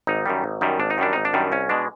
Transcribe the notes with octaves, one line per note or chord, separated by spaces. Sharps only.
G#1 D#4
F#2 D#3 G3
G#1
F#2 D#3 G3
G#1 D4
D#4
F#2 D#3 G3 D4
G#1 D#4
D4
F#2 D#3 G3
C2 C#4
B2 G#3 D4